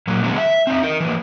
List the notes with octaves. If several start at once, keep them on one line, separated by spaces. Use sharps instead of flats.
A#2 F#3 A#3
D3 F3 F#3 G#3 B3 F#4
E5
C4 D#4 E5
D#4 A#4
E3 F3 A#3